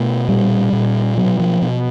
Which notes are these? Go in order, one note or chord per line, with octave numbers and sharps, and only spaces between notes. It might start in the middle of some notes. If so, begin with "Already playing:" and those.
Already playing: B2 A3
A#2 G3
A#2
B2 F#3
F3
B2